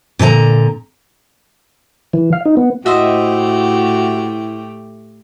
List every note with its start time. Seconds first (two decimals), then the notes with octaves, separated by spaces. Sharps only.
0.19 A#2 D3 D5 A#5
2.13 E3
2.33 F5
2.45 D#4
2.57 B3
2.86 A2 A3 E4 F#4 G4 C5 D#5 E5